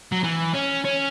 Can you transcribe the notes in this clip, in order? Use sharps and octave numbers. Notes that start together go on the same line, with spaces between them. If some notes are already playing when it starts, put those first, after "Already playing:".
F#3
E3
C#4
C#4